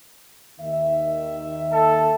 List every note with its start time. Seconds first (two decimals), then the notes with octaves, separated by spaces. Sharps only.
0.59 D#2 D#3 E5
1.73 A4 A5